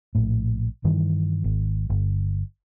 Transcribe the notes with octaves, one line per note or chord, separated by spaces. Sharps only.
A#1 A2
G2 D#3 E3
G#1
G1